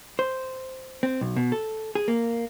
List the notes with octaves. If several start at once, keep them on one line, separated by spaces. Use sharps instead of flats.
C5
C4
B1
B2
A4
G#4
A#3